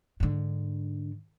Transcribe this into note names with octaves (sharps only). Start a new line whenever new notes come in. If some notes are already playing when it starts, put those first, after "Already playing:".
G#2 D3